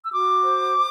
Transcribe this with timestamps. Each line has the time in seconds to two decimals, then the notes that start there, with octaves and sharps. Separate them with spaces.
0.05 E6
0.12 F#4 D6
0.44 C5